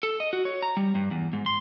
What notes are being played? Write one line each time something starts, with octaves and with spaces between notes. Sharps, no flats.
A4
D#5
F#4
C#5
A#5
G3
G2
E2
G#2
C6